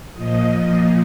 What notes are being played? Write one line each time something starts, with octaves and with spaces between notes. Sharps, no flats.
A#2 F3 D#5